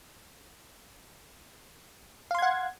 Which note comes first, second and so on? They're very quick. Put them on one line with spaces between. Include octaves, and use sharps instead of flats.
F5 C6 G#6 F#5